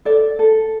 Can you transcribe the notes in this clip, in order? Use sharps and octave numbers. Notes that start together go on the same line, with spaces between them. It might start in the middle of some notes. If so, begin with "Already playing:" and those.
A4 D5
A4